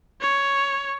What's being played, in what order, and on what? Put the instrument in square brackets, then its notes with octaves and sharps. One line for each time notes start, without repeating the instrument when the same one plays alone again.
[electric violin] C#5